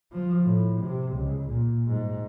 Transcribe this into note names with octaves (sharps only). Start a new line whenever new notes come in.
F3
A2
C3
C#2
A#2
G#2